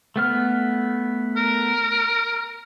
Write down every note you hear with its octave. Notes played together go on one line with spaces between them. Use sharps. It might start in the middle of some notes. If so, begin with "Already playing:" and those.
A3 B3 F6
A#4